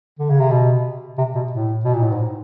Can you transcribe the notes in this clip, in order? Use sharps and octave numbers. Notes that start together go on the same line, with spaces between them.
D3
C#3
C3
B2
C3
B2
A2
B2
A#2
A2
G#2